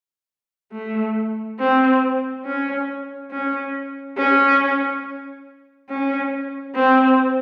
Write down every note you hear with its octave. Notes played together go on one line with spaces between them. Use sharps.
A3
C4
C#4
C#4
C#4
C#4
C4